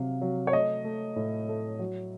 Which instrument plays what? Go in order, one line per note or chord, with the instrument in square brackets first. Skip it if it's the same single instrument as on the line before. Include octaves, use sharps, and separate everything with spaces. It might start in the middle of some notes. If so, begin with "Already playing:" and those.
Already playing: [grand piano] C3 F#3 F5
F#3
C#5
A3 D#5
A3
A2
A3
F#3